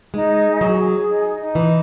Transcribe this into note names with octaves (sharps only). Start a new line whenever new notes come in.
G#3 D#4
G#4
F#3
G#4
D#4
D#4
E3